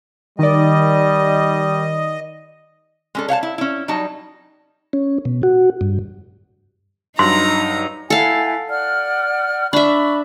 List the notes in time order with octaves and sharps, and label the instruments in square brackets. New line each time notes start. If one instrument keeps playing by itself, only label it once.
[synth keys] D#3 D5 [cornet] G3 [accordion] D#5
[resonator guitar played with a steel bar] G#3 C#4 A4
C#5 F5 F#5 A5
E4
C#4 E4
F#3 G3 D#4 A5
[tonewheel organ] C#4
B2
F#4
G2
[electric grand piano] G2 F#3 [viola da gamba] D#4 [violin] A#5 [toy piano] C6
[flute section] E4 F#5 G#5 [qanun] A4 F5
[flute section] D5 F#5 F6
[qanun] D4 E5 [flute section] B5 C#6